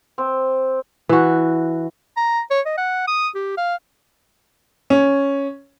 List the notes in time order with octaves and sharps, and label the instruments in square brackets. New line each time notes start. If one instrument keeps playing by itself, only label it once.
[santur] C4
[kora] E3 F#4
[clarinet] A#5
C#5
D#5
F#5
D#6
G4
F5
[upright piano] C#4